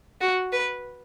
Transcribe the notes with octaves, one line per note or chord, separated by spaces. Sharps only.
F#4
B4